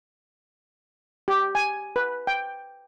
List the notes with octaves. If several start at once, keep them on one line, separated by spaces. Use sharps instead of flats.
G4
G#5
B4
G5